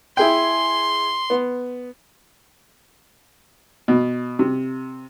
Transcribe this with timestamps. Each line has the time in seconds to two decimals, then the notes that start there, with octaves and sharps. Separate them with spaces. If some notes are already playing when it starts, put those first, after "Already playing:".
0.17 E4 G#4 G5 C6
1.30 B3
3.88 B2
4.39 C3